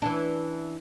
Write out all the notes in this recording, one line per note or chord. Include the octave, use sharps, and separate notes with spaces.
E3 C#4 D4